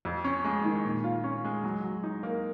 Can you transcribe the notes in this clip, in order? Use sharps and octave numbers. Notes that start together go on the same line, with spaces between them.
F2
C#4
G#3
D#3
A#2
F4
C#4
G#3
F#3
F#3
D#4
A#3